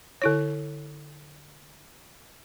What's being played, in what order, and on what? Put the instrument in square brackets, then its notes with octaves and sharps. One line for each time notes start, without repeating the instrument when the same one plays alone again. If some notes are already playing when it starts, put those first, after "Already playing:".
[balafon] D3 E4 C#5